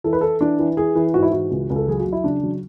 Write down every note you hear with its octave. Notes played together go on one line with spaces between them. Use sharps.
E3 A4
B4
E3 A4
E3 D4
E3
E3 G#4
E3
G#2 F#4
E4
E3 F#4
C#2
C#2
A4
F#3 G#4
F#4
F#3
E4
C#3 D4
F#3